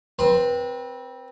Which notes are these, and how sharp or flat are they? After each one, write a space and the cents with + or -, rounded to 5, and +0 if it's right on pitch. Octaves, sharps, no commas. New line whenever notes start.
C4 +0 B4 -30 C6 +0